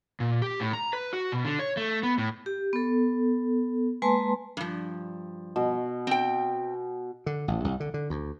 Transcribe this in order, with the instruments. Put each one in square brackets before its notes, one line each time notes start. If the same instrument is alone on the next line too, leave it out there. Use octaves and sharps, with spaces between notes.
[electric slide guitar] A#2
G4
A2
A#5
B4
F#4
B2
D3
C#5
A3
B3
A2
[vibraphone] G4
B3 A4
G#3 A#3 B4 G#5 A5 C6
[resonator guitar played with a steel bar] G2 F3
[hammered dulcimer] B2
[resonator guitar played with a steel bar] C4 G5
[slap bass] D3
A1
C2
D3
D3
D2